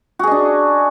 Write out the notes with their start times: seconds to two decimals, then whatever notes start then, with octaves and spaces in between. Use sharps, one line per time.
0.19 F#4
0.23 G#4
0.27 D#5
0.31 D4